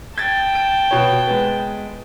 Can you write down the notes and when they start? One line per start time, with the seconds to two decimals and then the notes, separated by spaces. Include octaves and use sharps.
0.18 G5 A5 G#6 A6
0.55 D7
0.91 B2 C#5
1.27 G#3 B3